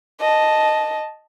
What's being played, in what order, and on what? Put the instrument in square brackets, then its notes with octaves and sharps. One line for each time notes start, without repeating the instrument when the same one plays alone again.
[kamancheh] D#5 A5